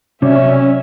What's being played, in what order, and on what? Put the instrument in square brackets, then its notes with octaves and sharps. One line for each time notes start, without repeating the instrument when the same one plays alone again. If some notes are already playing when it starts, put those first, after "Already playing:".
[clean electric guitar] C3 [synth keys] F#3 C#5 D5 [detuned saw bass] C#4 [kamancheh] E5